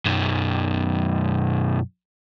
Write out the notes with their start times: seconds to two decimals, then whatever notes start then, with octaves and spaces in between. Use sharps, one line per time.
0.05 B1 F#2